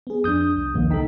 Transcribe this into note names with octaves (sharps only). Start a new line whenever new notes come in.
B3 G#4
F2 D4 D#6 G6
C2
A#1 D#2
C2 D#4 A4 G5 B6